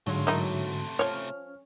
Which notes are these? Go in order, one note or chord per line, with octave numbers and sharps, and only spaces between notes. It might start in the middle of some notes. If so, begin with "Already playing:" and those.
G#2 D3 F#3 G#3 A3 F4
C3 D#3 A3 D#4 E4
F3 C#4 C#5 F6